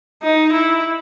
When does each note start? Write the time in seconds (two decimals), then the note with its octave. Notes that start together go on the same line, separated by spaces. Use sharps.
0.22 D#4
0.53 E4